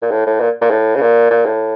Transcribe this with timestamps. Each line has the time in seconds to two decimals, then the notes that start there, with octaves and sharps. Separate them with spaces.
0.02 A#2
0.11 A2
0.27 A2
0.40 A#2
0.61 A#2
0.71 A2
0.96 C#3
1.01 A#2
1.30 A#2
1.46 A2